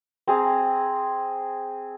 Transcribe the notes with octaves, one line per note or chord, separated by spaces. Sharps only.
C4 G#4 A#5